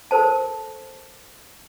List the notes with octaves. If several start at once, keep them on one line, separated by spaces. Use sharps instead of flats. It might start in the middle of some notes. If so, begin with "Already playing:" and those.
A4 A#4 C5 A5